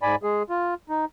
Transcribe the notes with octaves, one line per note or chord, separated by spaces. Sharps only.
G#2 D5 G#5 B5
G#3 G#4
F4
D#4